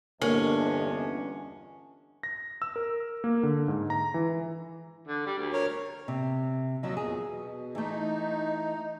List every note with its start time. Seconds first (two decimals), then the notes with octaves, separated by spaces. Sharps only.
0.22 G1 E2 A#3 C#4 D4 A#4 D#5
2.23 A#6
2.62 E6
2.76 A#4
3.24 A#3
3.43 D3
3.68 G#2
3.90 A#5
4.14 E3
5.07 D3
5.26 G3
5.38 D2
5.53 A#4 C#5
6.08 C3
6.83 D#2 F3 F#3 F#4 D#5 E6
6.97 E2 A#2 G#4
7.24 B2
7.75 E3 A3 D#4